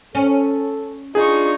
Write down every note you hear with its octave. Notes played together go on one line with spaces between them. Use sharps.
C#4 A4
D4 D#4 F4 G#4 C#6